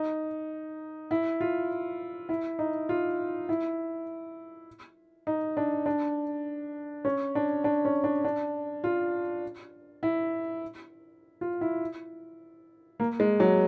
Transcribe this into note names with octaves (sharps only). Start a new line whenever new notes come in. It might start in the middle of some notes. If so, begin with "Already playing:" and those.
Already playing: D#4
E4
F4
E4
D#4
F4
E4
D#4
D4
D4
C#4
D4
D4
C#4
D4
D4
F4
E4
F4
E4
A#3
G#3
F#3